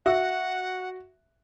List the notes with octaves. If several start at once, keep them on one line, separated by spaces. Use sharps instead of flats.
F#4 E5 F#5 E6